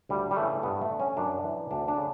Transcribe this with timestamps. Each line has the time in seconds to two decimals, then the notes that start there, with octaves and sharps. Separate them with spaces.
0.09 D2 G3
0.31 G3
0.36 C#3 E3 A3
0.63 G2 B3
0.81 A3
0.90 D3
1.00 C#4
1.17 F#2 D4
1.45 E3
1.71 D2 D4
1.88 D4
1.98 C#3